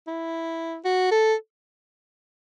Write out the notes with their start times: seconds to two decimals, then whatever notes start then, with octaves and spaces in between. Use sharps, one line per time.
0.07 E4
0.85 F#4
1.11 A4